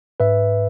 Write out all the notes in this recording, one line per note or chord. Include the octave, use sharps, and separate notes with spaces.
G#2 B4 E5